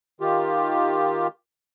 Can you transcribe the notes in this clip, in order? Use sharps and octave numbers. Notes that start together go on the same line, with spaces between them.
D#3 F4 G4